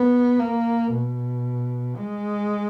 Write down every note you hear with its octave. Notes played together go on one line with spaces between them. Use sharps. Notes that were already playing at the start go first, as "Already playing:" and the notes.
Already playing: B3
A#3
B2
G#3